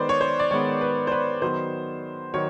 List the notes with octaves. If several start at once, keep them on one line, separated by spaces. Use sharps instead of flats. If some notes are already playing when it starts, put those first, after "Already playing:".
Already playing: D#3 G#3 B3 B4 C5 D5
C#5
C5
D5
D#3 G#3 B3 C#5
B4
C5
B4
D#3 F#3 B3 C5
D#3 F#3 C#5